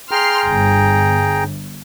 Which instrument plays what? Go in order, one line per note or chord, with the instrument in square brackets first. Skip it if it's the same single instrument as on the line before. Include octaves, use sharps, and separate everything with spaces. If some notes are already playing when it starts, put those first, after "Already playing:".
[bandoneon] G#4 G5 A#5 [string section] C6 F6
[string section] G1